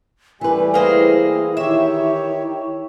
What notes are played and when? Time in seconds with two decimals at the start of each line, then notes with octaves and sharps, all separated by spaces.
0.41 E3 G3 A3 G4 B4 G#5
0.74 A#3 E4 G#4 C5
1.57 D#3 G4 C#5 E5